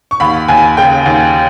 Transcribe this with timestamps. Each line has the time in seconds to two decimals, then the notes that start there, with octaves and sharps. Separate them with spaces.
0.11 C#6
0.20 D#2 B5
0.48 D#2 G#5
0.77 C#3 G5
1.06 D#2